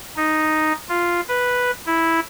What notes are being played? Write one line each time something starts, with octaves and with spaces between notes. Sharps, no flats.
D#4
F4
B4
E4